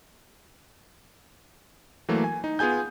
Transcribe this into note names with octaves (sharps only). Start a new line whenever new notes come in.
E3 F#3 A3 A#3
G#5
D#4
B3 F4 G#4 G#5 G6